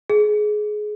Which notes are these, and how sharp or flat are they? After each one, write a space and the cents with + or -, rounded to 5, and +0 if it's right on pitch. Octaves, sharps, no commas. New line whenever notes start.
G#4 +20